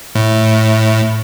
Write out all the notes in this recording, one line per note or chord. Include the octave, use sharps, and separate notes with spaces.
A2